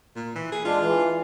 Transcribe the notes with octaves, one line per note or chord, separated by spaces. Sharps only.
A#2
E3
G#4
G#3 D4 F4
E3